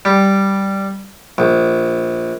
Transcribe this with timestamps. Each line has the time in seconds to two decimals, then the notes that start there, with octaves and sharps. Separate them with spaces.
0.05 G3
1.38 A#1